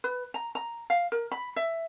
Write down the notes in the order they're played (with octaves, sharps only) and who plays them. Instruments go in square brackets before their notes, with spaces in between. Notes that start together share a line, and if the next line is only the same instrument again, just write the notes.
[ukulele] B4
A#5
A#5
F5
A#4
B5
E5